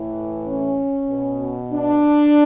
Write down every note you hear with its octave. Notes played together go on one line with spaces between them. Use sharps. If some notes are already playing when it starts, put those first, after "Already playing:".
Already playing: A2 E3
C#4
B2
D4